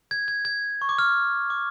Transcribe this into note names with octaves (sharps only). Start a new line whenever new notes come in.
G#6
G#6
G#6
C#6
D6
F6
D6